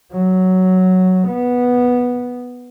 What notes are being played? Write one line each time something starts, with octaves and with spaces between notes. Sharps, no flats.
F#3
B3